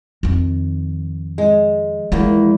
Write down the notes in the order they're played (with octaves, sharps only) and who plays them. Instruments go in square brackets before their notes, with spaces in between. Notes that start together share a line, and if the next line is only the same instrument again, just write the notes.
[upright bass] F2 D#3
[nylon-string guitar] G#3
[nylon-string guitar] E2 A#3 [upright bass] F3 G#3